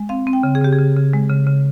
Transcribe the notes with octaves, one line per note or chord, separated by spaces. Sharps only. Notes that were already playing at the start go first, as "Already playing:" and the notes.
Already playing: G#3
C4 F5
C4
G5
C#3
G#4
C#3 G4
G#4
C#3
C#3
G#3
C#3
C#3